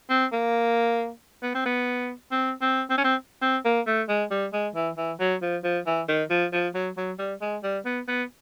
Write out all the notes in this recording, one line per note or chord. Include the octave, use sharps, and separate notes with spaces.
C4
A#3
B3
C4
B3
C4
C4
C4
C#4
C4
C4
A#3
A3
G#3
G3
G#3
E3
E3
F#3
F3
F3
E3
D#3
F3
F3
F#3
F#3
G3
G#3
G3
B3
B3